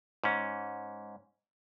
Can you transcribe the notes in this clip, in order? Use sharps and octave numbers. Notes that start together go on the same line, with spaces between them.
G#2 C#4